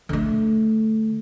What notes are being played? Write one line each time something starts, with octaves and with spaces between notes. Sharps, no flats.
D3 A3